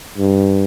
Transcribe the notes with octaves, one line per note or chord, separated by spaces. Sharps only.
G2